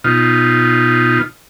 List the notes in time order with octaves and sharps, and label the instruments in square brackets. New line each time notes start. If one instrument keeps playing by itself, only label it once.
[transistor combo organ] B2 D#4 F4